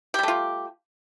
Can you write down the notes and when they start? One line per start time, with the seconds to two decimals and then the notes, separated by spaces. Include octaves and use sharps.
0.14 G4
0.19 G3
0.23 A3
0.28 F4